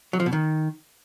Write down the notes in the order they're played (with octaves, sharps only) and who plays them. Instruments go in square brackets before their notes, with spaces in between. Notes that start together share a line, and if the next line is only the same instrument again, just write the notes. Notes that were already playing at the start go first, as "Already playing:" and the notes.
[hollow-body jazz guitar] F#3
F3
B2
D#3